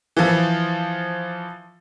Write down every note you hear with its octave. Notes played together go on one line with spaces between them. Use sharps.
E3 F3